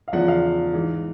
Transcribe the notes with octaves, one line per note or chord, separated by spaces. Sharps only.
F5
E2 C#3 F3 F#5
F5
G#2 E3 G#3